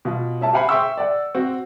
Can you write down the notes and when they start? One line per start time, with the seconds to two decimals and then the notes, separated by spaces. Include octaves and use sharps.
0.05 B2 F4
0.41 C#4 E5 A5
0.53 G4 C5 F5 F#5 G#5 B5
0.69 E5 G5 C6 C#6 E6
0.98 D5 F#5
1.35 C4 F#4